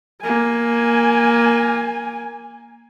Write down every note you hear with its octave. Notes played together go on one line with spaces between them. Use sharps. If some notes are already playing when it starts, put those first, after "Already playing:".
A#3 G#5